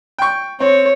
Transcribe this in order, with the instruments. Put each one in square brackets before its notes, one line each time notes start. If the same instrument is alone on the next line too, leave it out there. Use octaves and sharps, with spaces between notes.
[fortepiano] G5 C#6
[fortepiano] C4 [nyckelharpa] C#5